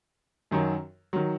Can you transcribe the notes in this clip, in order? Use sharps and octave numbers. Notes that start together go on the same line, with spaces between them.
F#2 D#3 F#3
D#3 F#3